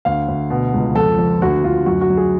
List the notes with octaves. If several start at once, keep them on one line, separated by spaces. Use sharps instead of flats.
D2 F5
D2
B2
C#2
F2 A4
F2
D2 F#4
D2 F4
F#2 F#4
F#4
F#2
G#4